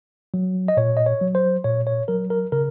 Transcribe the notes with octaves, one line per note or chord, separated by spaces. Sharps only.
F#3
D#5
A#2 C#5
D#5
C#5
F#3
C5
A#2 C#5
C#5
F#3 A#4
A#4
C#3 A#4